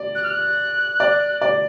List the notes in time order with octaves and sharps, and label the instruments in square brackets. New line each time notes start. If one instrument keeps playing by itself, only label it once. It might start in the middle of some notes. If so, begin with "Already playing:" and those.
Already playing: [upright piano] D5
[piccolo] F#6
F6
F#6
[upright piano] D5
D5